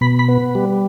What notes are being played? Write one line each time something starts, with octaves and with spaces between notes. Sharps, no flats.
B2 B5
B5
B3
G3